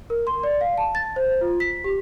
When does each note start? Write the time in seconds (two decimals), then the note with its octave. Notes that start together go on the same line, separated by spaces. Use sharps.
0.10 A#4
0.27 C6
0.43 D5
0.61 F5
0.78 A5
0.95 A6
1.16 C5
1.41 F4
1.60 B6
1.84 G4